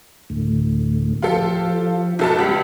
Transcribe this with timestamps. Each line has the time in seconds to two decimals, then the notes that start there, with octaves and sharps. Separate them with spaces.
0.30 D2 A2
1.22 F3 F4 G4 A4
2.19 B1 A4 A5
2.39 C#2 G3 B5